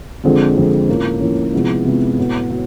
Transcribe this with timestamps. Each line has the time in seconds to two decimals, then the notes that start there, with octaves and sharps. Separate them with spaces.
0.24 F2 D3 F3 G#3 C4
0.56 F2 D3 F3 G#3 C4
0.88 A2 F3 A#3 C#4
1.20 A2 F3 A#3 C#4
1.53 C3 F3 G#3 B3 E4
1.85 C3 F3 G#3 B3 E4
2.18 A2 F#3 B3
2.51 F#3 B3